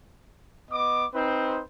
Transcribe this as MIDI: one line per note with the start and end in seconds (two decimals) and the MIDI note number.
0.70 1.06 59
0.70 1.06 75
0.70 1.06 86
1.14 1.62 60
1.14 1.62 63
1.14 1.62 71
1.14 1.62 72